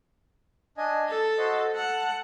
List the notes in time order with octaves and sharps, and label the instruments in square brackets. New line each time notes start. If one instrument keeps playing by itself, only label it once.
[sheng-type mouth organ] D4 D#5 G#5
[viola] A4 [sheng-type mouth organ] A5
[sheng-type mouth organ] F#4 C5 D#5
[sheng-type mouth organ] A4 A5 [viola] F#5